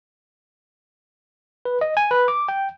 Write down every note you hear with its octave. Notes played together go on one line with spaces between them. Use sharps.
B4
D#5
G#5
B4
D6
G5